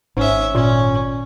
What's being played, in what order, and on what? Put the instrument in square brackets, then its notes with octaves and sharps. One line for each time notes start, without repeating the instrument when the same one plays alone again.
[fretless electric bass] G#1 [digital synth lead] G#2 [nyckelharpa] C#4 E5
[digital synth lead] A#2 [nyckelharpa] C#4